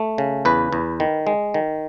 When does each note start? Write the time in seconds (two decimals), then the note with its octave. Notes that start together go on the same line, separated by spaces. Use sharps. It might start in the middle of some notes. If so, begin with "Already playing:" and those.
Already playing: A3
0.18 C#3
0.45 E2 B4
0.72 E2
1.00 D#3
1.27 G#3
1.54 D#3